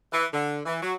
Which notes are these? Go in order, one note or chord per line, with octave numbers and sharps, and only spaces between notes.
E3
D3
E3
F#3